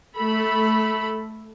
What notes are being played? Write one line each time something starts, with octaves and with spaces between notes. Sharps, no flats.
A3 A4 B5